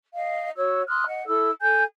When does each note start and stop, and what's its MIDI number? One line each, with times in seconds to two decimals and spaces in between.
0.15 0.49 75
0.15 0.49 77
0.56 0.82 66
0.56 0.82 73
0.56 0.82 88
0.88 1.04 84
0.88 1.04 87
0.88 1.04 89
0.88 1.04 90
1.06 1.26 75
1.06 1.26 78
1.27 1.49 64
1.27 1.49 69
1.27 1.49 88
1.61 1.83 69
1.61 1.83 80
1.61 1.83 91